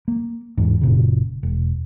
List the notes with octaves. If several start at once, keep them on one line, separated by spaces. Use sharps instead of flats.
A#3
E2 G#2
F#1 A#2 C#3
E1